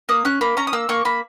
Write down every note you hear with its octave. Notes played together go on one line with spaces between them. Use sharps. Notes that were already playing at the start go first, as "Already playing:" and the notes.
A#3 D#6
C#4 F#6
A#3 B5
C#4 A#5
D#6
A#3 E6
A#3 C#6
A#3 B5